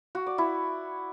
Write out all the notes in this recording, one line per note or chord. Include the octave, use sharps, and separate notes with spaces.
F#4
D5
E4